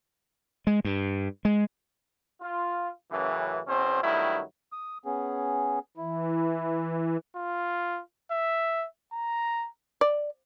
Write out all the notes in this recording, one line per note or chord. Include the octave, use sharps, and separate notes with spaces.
G#3
G2
G#3
F4
F#2 A2 C#3 E3
E2 B2 C4 C#4 C5
G2 D#3 F#3 A3 E4
D#6
B3 C#4 G#4
E3 E4
F4
E5
A#5
D5